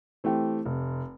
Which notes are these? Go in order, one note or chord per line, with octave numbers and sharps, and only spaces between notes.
E3 A3 C4 G4
F1